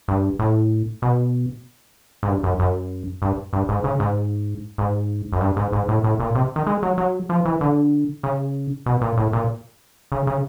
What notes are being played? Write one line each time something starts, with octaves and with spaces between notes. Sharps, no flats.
G2
A2
B2
G#2
G2
F#2
F#2
G2
G2
G#2
C#3
G#2
G#2
F#2
G2
G#2
G#2
A2
A2
A#2
C3
D#3
G#3
F#3
F#3
F3
E3
D3
C#3
B2
A#2
A2
A#2
C#3
C#3